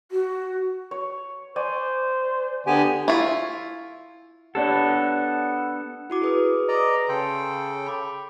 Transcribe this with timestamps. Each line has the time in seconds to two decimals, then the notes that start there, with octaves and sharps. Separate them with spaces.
0.11 F#4
0.91 C#5
1.56 C5 D5 G#5 C#6
2.67 D3 B3 G4 G#5
3.08 E4 F4 C#6
4.55 B3 D4 G4 A4 C#5 D5 F#5
6.10 E4 F#4 D6
6.22 G#4 B4 D#6
6.68 D5 D#5 A#5
7.09 C#3 A4 G5 C6
7.86 B5 D6